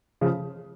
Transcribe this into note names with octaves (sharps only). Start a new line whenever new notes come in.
C#3 F3